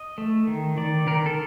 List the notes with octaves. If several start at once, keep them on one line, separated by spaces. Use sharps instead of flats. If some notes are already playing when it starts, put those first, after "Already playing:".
Already playing: D#5
A3
D#3
D#3 D5
D#3 A#4
A4